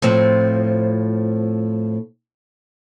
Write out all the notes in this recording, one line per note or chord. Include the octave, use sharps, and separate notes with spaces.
A2 F3 C4